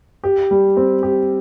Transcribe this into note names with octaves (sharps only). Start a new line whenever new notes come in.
G4
G3
C4
G4